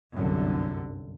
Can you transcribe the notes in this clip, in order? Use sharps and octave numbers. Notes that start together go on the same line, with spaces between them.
G1 C2 F#2 D3